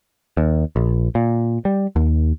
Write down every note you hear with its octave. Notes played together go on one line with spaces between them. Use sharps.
D#2
A#1
A#2
G3
D#2